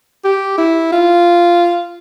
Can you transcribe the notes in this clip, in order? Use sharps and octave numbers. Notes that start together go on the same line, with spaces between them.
G4
E4
F4